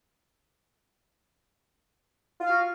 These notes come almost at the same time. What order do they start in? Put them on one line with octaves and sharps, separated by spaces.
F4 F5 F#4